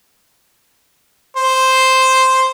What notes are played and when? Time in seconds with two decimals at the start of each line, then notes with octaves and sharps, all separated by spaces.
1.36 C5